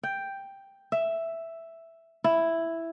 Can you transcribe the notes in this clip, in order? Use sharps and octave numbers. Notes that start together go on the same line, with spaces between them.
G5
E5
E4